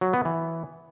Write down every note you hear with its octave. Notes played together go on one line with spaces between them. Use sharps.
F#3
B3
E3